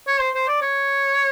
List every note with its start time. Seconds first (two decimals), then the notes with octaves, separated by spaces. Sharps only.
0.07 C#5
0.20 C5
0.35 C5
0.48 D5
0.62 C#5